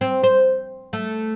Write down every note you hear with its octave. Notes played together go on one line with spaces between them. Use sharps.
C4
C5
A3